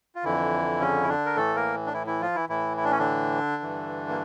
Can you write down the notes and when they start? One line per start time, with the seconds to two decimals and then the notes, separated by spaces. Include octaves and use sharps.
0.15 F4
0.24 F2 D3 E3 E4
0.80 C#3 C#4
1.03 E4
1.09 D3 D4
1.26 A#4
1.36 A2 E3 A3 A4
1.55 A#3 A#4
1.86 D4
1.93 E3 E4
2.07 E3 E4
2.21 F3 F4
2.35 E3 E4
2.49 A2 E3 E4
2.77 E4
2.84 D4
2.92 C#4
2.99 D3 D4
3.62 G2 E3
4.09 A#3